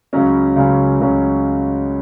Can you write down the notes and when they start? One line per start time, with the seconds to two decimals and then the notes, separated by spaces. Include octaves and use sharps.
0.13 C#2 C#3 F#3 C#4
0.56 C#2 C#3 F#3 C#4
1.00 C#2 C#3 F#3 C#4